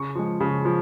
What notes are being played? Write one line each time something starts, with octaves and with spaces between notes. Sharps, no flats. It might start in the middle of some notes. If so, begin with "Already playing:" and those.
Already playing: C#3 C#6
F3 G#3
C#3
F3